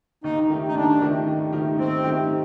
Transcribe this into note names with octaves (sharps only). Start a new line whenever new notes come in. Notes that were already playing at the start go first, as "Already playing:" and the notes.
D#2 D#4
D#3 A3 D#4 G4
D#4
D#2 D4
D#3 A3 D#4 G4
D#2
D#3 A3 D#4 G4
D#2 C4
D#3 A3 D#4 G4